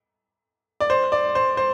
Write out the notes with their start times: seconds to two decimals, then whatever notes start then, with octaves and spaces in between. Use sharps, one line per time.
0.80 D5
0.90 C5
1.12 D5
1.35 C5
1.57 C5